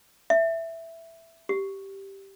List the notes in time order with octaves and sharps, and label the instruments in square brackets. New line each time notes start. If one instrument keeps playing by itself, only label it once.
[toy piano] E5
G4